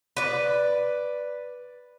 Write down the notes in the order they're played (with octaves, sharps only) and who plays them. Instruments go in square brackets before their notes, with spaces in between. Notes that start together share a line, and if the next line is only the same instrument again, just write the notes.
[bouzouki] B4 D5